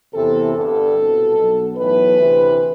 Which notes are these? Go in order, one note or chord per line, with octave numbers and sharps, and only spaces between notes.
E2 C3 E3 A4
G1 G2 D3 A4
C2 B2
B1 B2
B1 A2 E3 B4
D2 C3 E3